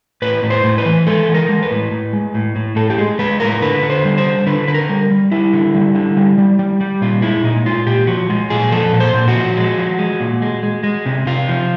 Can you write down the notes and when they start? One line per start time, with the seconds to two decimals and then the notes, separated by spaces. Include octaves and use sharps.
0.22 A2 B4
0.43 A2
0.50 C5
0.64 A2
0.78 B4
0.86 E3
1.07 G#3 A4
1.29 E3
1.34 A#4
1.49 G#3
1.63 B4
1.71 A2
1.92 A2
2.13 G#3
2.34 A2
2.56 A2
2.76 A2 A4
2.90 G4
2.98 G#3 G#4
3.19 G#3 B4
3.40 A2 A#4
3.62 D3 B4
3.83 D3
3.90 C5
4.05 G3
4.18 C5
4.26 D3
4.47 D3 B4
4.68 D3 B4
4.74 A#4
4.90 G3
5.11 G3
5.32 G3 E4
5.53 D3
5.75 G3
5.95 D3
6.17 G3
6.38 G3
6.59 G3
6.81 G3
7.01 A#2 F4
7.22 G#3 E4
7.44 A#2 D#4
7.66 G#3 F4
7.86 A#2 G4
8.07 F3 F#4
8.30 G#3 F4
8.50 A#2 G#4
8.72 F3 A4
8.93 A#2
9.00 C5
9.14 A#2
9.28 F#4
9.36 F3
9.57 G#3
9.78 F3
9.99 G#3
10.20 A#2
10.42 G#3
10.63 G#3
10.83 G#3
11.06 C3
11.26 C3 F4
11.48 F3